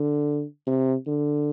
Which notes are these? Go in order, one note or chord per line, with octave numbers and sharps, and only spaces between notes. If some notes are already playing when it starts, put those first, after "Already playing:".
Already playing: D3
C3
D3